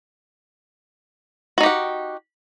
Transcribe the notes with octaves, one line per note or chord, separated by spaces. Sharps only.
D#4 F#4 G4 F#5